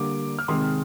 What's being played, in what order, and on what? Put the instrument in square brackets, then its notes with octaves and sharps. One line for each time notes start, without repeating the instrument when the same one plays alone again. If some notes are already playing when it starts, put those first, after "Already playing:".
Already playing: [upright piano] D3 G3 A#3 D6
F6
C3 D#3 G#3 C6 D#6